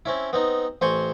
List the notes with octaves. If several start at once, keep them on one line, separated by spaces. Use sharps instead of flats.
C4 C#4 E4
B3 C4 D#4
A1 C4 C5 G#5 C6 C#6